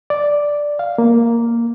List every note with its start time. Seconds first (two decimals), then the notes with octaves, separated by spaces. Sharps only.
0.10 D5
0.79 F5
0.98 A#3